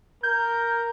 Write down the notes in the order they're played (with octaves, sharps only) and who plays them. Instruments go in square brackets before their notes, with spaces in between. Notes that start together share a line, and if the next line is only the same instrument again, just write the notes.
[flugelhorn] A#4 [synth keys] G6